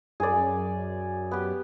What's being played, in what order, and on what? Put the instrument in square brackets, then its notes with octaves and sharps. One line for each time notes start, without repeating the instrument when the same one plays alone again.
[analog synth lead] F#2 [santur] G#4 D5
[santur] B3 G4